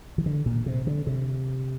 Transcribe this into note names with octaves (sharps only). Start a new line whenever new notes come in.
E3
D3
A#2
C3
D3
C3